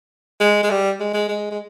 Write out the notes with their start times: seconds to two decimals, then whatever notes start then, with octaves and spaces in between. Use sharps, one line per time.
0.40 G#3
0.63 G#3
0.70 G3
1.00 G#3
1.14 G#3
1.28 G#3
1.51 G#3